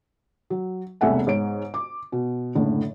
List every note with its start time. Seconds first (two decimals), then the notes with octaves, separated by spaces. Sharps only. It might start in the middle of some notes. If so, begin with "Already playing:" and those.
0.50 F#3
1.01 E1 C2 A3 E5 F#5 G#5
1.27 G#2 C#5 D7
1.74 D6
2.12 B2
2.55 F#1 A2 D3